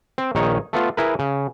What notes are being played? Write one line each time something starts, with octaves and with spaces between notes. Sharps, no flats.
C4
A#1 D#3 D#4 C#5
A3 B3 F4
E4 G#4 A#4 B4
C#3